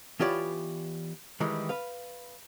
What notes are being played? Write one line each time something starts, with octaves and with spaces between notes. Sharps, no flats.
E3 B3 F4 G4 C#5 D5
D#3 E3 G3 G#3
B4 F5